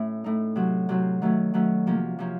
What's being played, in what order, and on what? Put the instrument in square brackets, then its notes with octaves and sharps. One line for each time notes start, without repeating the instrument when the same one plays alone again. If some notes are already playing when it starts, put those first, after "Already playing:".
Already playing: [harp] A2 A3 C#4
A2 A3 D#4
C3 F#3 C4
C3 F#3 C4
D#3 F#3 A3 C#4
D#3 F#3 A3 C#4
C3 F3 A#3 C#4
C3 F3 A#3 C#4